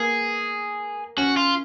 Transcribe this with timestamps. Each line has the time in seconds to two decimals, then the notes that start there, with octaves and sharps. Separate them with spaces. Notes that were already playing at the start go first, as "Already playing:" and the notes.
Already playing: A#3 G#4
1.17 C#4 F#4
1.37 F4